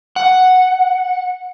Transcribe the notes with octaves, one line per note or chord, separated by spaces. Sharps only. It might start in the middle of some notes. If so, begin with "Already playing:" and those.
F#5